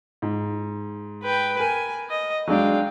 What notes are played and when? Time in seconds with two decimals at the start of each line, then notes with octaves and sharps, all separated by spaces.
0.22 G#2
1.23 B4 G5
1.60 A#4 G#5
2.10 D#5
2.48 F#3 G#3 D4 F5 G5